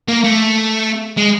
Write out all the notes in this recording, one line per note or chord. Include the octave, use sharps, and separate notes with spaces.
A#3
A3
G#3